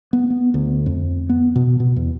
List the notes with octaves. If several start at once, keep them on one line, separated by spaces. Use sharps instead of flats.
B3
B3
D2
F2
B3
B2
B2
E2